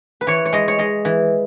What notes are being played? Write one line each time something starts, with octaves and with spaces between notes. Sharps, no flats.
B4
E3 C#5
C#5
G#3 D#5
C#5
G#3 D#5
E3